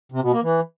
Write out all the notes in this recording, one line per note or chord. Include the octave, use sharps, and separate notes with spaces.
C3
B2
A#3
E3